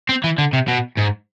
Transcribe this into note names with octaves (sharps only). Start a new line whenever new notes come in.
C4
E3
D3
C3
B2
G#2